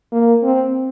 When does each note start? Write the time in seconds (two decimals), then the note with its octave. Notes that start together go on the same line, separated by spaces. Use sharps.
0.12 A#3
0.43 C4